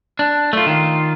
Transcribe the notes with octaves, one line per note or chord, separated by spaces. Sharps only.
D4
A3 F4
D#3 F4